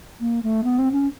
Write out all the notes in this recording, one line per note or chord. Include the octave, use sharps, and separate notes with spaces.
A#3
A3
B3
C4
C#4